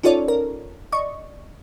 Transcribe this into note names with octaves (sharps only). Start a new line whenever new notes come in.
C#4 D#4 F4 A4 C#5 D5
A#4
D5 D#5 C#6